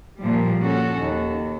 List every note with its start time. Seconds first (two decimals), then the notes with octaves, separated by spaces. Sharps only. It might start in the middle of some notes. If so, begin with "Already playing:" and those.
0.20 A#2 F3 G3
0.63 C#4 F#4 A4
0.99 D#2